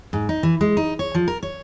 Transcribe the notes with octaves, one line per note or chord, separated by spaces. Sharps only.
G#2
D#4
E3
G#3
D#4
C#5
F3
A#4
C#5